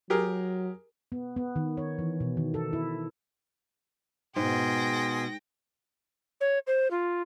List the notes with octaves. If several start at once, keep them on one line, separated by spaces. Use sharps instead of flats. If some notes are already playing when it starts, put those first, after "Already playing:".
F#3 G4 G#4 A#4
B3
B3
D#3
C#5
E3
B2
D#3
A4
E4
G#2 B2 G#4 G5 C6 A#6
C#5
C5
F4